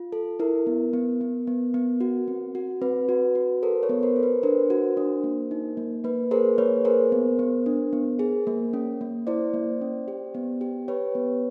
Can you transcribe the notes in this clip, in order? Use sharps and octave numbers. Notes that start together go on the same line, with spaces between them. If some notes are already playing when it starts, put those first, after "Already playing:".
Already playing: F4
A4
E4 A#4
B3
B3
B3
B3
B3
F#4
C4
F#4
C4 B4
F#4
F#4
A4 A#4 C5
B4 C#5
B3
A#4 C5
A4
B4
D4 A#4 C5
F#4
D4
A#3
D#4
A#3
A#3 B4
G#4 A#4 C5
A#3 B4 C#5
G#4 A#4 C5
B3
B3
D4
B3
G#4
A#3
C#4
A#3
E4 C5 D5
A#3
C#4
G4
B3
G4
G4 B4 C#5
B3